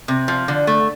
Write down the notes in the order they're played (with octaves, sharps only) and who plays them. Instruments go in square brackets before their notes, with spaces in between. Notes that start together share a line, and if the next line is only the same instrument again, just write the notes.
[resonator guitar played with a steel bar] C3
F3
D3
A3